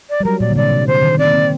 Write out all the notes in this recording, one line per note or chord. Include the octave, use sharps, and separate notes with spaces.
D5
G3
F#3 A#4
A#2 D5
D3
C3 D5
C3
D3 C5
D#3
C4 D5
A#3
C4